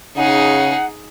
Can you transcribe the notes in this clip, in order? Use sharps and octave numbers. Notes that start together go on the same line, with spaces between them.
C#3 D#4 G#4 F#5